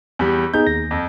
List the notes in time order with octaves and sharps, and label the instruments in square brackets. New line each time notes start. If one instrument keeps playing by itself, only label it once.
[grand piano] E2 G3
[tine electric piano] B3 D#4 G#4 [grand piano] G6
[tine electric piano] D#2 A#6
[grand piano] F2